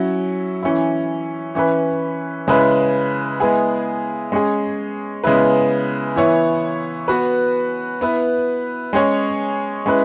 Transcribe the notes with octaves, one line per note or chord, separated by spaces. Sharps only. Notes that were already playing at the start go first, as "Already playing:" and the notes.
Already playing: F#3 C#4 E4
E3 C#4 E4
E3 C#4 E4 B4
C#3 G#3 E4 B4
G#3 B3 E4 G#4
G#3 C#4 G#4
C#3 G#3 B3 E4 B4
E3 B3 E4 C#5
B3 F#4 B4
B3 E4 B4
G#3 C#4 G#4 C#5
G#3 C#4 E4 B4